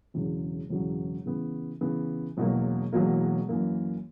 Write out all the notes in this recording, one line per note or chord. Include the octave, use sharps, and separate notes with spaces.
E1 E2 C#3 F#3
E1 E2 C#3 F#3
C#3 E3 B3
C#3 E3 B3
E1 E2 B2 F#3 A#3
E1 E2 B2 F#3 A#3
F#2 E3 A#3